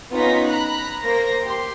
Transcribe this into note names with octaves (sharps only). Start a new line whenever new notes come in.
B3 C#4 D#4 F4 A#6 B6
A#5 B5 F#6
A#3 C5 A#6
G4 C6